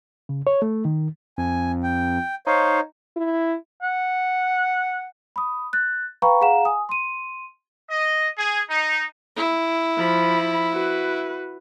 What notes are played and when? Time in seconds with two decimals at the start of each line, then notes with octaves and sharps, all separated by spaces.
0.29 C#3
0.47 C#5
0.62 A3
0.85 D#3
1.38 F2 G#5
1.83 G5
2.47 D#4 C5 C#5 F5
3.16 E4
3.83 F#5
5.36 B5 D#6
5.73 F#6 A6
6.22 B4 F5 G5 A#5 B5 C#6
6.41 G#4 F5 F#5 A#5 E7
6.65 G#5 D#6
6.89 C6 D#7
7.90 D#5
8.37 G#4
8.69 D#4
9.37 E4
9.98 F3 B5
10.72 F#4 B4